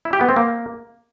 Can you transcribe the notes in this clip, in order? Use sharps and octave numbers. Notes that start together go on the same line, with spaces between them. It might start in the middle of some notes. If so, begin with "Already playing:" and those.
E4
G4
B3
C4
A#3